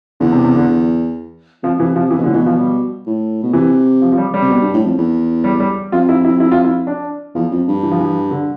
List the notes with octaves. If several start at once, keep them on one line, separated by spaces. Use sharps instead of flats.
E2 D3
C3
C3
D3
F2 F3
C3 E3
C3 F3
C3 E3
B2
A2 D3
B2 E3
F3
G3
A2
B2
C3 E3
F3
F3
G3
G3
C3
B2
G2
A2
F2
E2
G3
G3
F2 F4
E4
E4
E4
F4
E4
D4
E2 F3
F2
G2
E3
F3
E3
D3